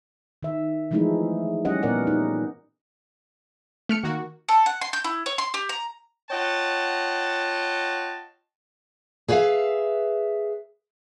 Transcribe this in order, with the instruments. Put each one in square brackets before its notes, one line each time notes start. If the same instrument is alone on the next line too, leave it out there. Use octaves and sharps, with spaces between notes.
[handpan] D#3 E5
E3 F3 G#3 A3 D#4 E4
G3 C#4 G4 D#5 F#5
A#2 B3 A#4 D5 F#5
D#4
[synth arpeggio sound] A3 F6 C#7
[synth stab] D#3 A#3 F#4
[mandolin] A4
F#5
C6
G6
E4
C#5
C6
G4
A#5
[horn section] F4 C#5 D#5 F#5 G5 A5
[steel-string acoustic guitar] G#4 B4 C#5 E5 F5